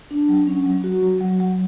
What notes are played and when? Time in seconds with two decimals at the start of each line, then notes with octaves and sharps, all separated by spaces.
0.11 D4
0.28 F#3
0.47 C#4
0.66 F#3
0.84 F#4
1.02 F#3
1.21 F#3
1.40 F#3